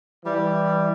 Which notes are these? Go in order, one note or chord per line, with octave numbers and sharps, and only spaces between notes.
E3 G3